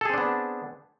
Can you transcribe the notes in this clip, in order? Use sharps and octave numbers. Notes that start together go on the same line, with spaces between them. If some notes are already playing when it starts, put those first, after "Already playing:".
B3 C4 D4 G#4 A4